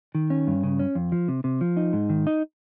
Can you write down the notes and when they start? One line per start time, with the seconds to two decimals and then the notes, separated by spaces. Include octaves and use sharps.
0.15 D#3
0.30 C#4
0.47 G2
0.64 C#3
0.79 C#4
0.95 F2
1.12 F3
1.28 C3
1.44 C3
1.61 F3
1.77 D#4
1.93 G#2
2.10 D#3
2.27 D#4